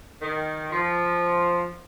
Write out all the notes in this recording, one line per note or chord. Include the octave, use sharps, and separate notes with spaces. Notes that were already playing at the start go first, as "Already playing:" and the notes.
D#3
F3